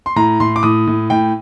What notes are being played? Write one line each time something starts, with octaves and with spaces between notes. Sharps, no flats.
C6
A2 A#5
A2 C6
D6
A2 D#6
A2
A2 G5